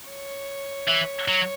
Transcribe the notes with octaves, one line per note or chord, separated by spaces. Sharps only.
C#5
E3
F#3